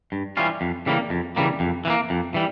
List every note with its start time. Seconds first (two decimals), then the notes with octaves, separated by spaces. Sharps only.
0.12 G2
0.37 E3 G3 C#4 F4
0.61 F2
0.86 C#3 E3 G3 A#3
1.10 F2
1.36 C#3 E3 G3 A#3
1.60 F2
1.85 E3 G3 A#3
2.10 F2
2.34 E3 G3